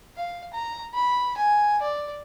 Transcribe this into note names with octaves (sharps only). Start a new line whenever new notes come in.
F5
A#5
B5
G#5
D5